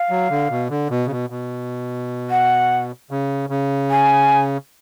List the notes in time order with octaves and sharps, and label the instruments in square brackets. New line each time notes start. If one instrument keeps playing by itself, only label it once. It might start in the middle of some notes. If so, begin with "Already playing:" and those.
Already playing: [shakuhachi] F5
[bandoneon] F#3
D3
B2
D3
B2
C#3
B2
B2
[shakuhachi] F#5
[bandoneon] C#3
C#3
[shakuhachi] G#5